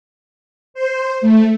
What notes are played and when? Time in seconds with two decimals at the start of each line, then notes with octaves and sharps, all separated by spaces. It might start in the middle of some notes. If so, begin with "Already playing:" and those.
0.74 C5
1.21 A3